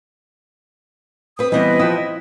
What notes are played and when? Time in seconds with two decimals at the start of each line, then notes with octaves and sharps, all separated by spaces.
1.39 C4 B4 D#6
1.52 E3 G3 B3 C4 E4 B4 D#5
1.79 F3 E4 G5 D#6
1.98 D#5